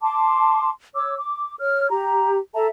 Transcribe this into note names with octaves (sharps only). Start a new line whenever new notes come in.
A5 C6 D6
C#5 D6 E6
D6
C#5 F6
G4 A#5
A4 E5 A5 A#5